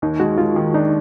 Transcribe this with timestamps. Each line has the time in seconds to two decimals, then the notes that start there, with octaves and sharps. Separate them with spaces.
0.02 D#2 D#4
0.20 G#3 F#4
0.38 G#3 F4
0.56 D#3
0.74 D4 D#4